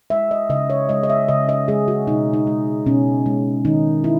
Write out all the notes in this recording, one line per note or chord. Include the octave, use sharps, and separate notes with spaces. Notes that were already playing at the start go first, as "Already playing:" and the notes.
G#3 E5
D#5
C#3 D#5
C#5
G#3 D#5
D#5
E5
C#3 D#5
D#5
G#3 G#4
F#4
B2 D#4
D#4
G#3
B2 C#4
G#3
D#3 D#4
E4